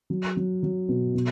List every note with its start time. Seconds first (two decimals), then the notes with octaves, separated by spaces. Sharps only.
0.10 F#3
0.37 F#3
0.63 F#3
0.89 B2
1.15 B2